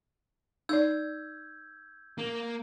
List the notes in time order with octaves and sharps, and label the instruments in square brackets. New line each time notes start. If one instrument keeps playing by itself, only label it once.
[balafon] D#4 D5 [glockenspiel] E6 G6 G#6
[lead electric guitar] A#3